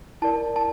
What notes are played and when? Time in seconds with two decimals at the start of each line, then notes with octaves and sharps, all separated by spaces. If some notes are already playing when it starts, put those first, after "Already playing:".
0.22 E4 A#4 D5 A5
0.56 A5